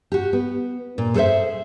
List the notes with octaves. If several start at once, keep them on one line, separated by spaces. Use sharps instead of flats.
F#4 G4
B3
A#2
G#4 A4 B4 C5 E5